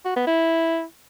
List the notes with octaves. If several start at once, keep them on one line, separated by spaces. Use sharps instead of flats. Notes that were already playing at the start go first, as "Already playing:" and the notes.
F#4
B3
E4